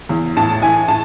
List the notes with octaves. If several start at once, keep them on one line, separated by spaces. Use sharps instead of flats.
E2
A2 A5
E3 G#5
A2 A5